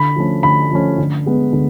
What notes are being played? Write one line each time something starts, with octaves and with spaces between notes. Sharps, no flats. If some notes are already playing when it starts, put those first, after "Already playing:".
Already playing: D3 B5
F3 A3 C#4
D3 B5
F3 A3 C#4
D3
G#3 B3
D3